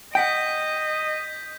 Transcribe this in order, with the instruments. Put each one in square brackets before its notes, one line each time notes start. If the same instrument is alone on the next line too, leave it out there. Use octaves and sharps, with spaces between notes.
[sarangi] D#5 [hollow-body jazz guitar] F#5 G5 [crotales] G6 B6